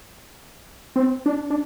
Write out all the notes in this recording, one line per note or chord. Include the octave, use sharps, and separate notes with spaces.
C4
D4
D4